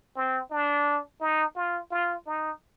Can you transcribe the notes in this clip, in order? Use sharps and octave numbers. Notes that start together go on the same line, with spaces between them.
C4
D4
D#4
F4
F4
D#4